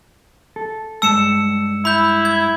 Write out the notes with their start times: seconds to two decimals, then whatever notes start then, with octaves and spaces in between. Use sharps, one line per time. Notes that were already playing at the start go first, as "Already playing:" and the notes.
0.56 A4
1.02 G2 G#3 A5 E6 C#7 E7
1.85 E4 B5 G6
2.25 G#6